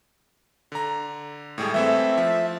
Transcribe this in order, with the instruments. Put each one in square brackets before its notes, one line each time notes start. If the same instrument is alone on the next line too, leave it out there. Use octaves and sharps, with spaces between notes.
[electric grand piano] D3 A#5
A2 G3 G#3
[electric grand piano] E3 A3 C4 [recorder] E5
[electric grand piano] F3